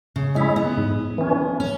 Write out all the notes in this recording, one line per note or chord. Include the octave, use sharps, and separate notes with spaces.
C#3
G#3 C#4 E4
B3
G#2
E3 C#4
C#4